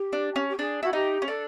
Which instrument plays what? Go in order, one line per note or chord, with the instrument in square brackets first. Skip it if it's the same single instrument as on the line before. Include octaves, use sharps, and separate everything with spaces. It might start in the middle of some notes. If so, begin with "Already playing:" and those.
Already playing: [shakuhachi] G4
[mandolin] D4
C#4
[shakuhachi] G4
[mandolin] D4 [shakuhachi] G#4
[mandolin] E4 [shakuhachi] F#4
[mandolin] D#4 [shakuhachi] G4
[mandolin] C#4
[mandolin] D4 [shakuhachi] A4